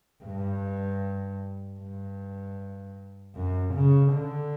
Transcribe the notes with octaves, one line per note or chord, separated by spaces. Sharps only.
G2
G2
F#2
C#3
D3